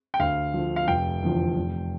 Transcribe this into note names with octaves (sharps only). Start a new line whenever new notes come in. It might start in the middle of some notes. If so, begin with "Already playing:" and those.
G5
D2 F5
D3 F3
F5
F1 G5
E2 D3 F3
F1